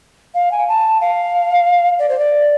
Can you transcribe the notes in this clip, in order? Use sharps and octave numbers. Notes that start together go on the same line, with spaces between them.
F5
G#5
A5
F5
D5
C5
D5